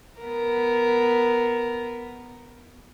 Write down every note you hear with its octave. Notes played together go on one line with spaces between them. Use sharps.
B3 A#4